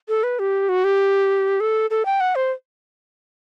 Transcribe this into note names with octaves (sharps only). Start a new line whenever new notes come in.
A4
B4
G4
F#4
G4
A4
A4
G5
F#5
C5